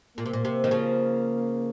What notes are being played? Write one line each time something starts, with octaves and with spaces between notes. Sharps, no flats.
A#2 A#3
C3
A#2
C3
D#3
C#3 F3